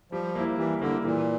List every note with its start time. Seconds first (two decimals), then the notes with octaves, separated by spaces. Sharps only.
0.12 F3 G3
0.35 A#3 E4
0.58 E3 G3
0.81 D3 A#3 E4
1.05 A#2 E3